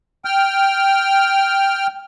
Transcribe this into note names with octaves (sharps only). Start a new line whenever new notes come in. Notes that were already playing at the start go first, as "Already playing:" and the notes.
G5 F6